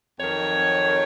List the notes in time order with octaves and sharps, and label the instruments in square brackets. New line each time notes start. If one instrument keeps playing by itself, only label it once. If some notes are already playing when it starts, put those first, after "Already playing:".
[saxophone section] F2 D#3 F#3 C#5